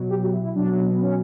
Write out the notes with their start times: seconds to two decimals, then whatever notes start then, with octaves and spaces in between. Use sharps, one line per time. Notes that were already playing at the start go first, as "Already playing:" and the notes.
Already playing: B2 F#3
0.10 G4
0.21 F#4
0.33 E4
0.44 E4
0.55 B2 F#3 D4
0.89 B3
1.01 C#4